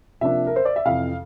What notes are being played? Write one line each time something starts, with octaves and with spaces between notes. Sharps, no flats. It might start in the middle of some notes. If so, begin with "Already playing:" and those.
C3 F3 A#3 D4 E5
A#4
C5
D5
E5
F2 C3 E3 F5